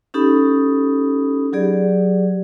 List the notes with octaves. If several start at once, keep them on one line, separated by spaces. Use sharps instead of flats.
C#4 D#4 G4 A4 B5 D#6
F#3 G4 G#4 D5